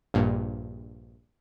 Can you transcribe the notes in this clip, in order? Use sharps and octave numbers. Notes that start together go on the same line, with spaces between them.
A#1 G2 A#2